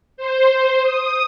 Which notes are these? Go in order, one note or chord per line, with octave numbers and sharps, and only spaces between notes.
C5
D#6